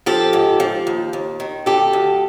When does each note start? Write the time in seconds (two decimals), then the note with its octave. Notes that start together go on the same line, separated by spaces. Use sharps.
0.06 F3 G4 A4
0.33 G#2
0.60 F3
0.87 D#2
1.13 D#2
1.40 D#3
1.66 D2 G4 A4
1.93 D2